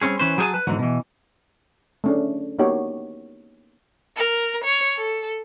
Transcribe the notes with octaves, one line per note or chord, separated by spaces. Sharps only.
G3 C4 C#4 G#4
E3 C#4 B4 C5
F#3 G#4 C5 E5 G#5 A5
B4
E2 G#2 D3 E3 F#3
B2 E3
A3 C#4 D4
A#3 B3 D#4 F#4 G4 C#5
A#4
C#5
A4